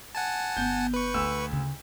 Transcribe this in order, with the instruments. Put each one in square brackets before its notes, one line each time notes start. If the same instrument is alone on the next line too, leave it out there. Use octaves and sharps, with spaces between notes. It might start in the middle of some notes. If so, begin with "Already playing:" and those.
[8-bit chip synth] F#5 G#5 A5
[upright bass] G1 B3 [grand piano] G6
[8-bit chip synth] B4 C#6
[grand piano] D2 E6
[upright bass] C#3 F4